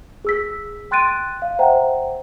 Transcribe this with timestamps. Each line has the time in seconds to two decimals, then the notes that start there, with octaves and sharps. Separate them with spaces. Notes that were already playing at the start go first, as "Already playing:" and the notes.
0.25 G#4 E6 B6
0.91 G5 C6 F#6 A6 D7 D#7
1.42 F5
1.59 C5 E5 F#5 G5 A#5